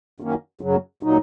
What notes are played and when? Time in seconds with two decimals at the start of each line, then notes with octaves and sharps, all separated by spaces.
0.20 F#2 D#3 A#3 C#4
0.61 F#2 C#3 F#3
1.03 A#2 F#3 D#4